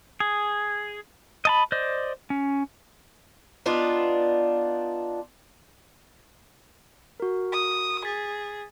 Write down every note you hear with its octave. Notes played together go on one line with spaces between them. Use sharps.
G#4
D#5 A5 B5
C5 D5 D#5
C#4
B3 D4 D#4 F4
F#4 A#4
D#6
G#4 A6 B6